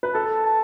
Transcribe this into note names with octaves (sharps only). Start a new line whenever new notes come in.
B4
A4 A5
A5